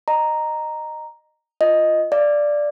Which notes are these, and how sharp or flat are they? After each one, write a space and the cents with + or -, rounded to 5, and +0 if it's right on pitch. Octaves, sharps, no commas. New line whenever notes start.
D#5 -20 A#5 +0
F4 +0 D#5 +0
D5 +0 F5 -30